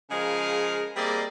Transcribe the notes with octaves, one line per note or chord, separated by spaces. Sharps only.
C#3 F3 G#3 G#4 A#4 F5
G3 A#3 C4 G#4 D5 D#5